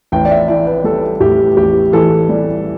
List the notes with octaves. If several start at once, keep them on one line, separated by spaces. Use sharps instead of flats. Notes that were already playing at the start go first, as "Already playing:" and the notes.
A1 G5
D5
E5
E3 D5
B4
G3 A4
A2 G4
A1 G4
E3 A4
G3